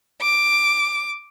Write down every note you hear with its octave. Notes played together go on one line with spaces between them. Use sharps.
D6